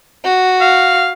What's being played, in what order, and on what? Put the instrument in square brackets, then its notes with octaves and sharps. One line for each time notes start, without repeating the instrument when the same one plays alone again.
[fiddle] F#4
[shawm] F5